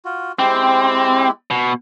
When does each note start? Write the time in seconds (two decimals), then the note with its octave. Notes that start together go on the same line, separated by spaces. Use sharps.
0.05 F4 F#4
0.39 G#3 C4 E4 G4
1.51 B2